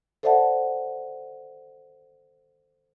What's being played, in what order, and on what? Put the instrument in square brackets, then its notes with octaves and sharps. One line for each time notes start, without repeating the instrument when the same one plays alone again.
[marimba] A4 C5 D5 E5 F#5 A5